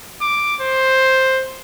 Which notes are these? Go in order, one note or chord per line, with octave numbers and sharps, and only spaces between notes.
D6
C5